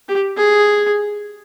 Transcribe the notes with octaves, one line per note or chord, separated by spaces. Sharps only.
G4
G#4